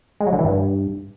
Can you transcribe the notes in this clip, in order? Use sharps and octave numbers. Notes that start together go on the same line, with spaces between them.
G#3
F#3
D3
E3
G2